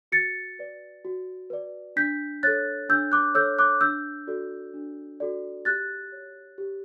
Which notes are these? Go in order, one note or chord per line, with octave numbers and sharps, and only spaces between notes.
F#4 A6 C#7
B4 D5
F#4
B4 D5
D4 G6 B6
A4 C#5 F#6 A6
D4 E6 G6
D6 F#6
A4 C#5 E6 G6
D6 F#6
D4 E6 G6
F#4 A4 D5
D4
F#4 A4 D5
G4 F#6 A6
C#5
G4